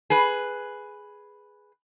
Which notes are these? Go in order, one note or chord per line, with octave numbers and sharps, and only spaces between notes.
G#4 B4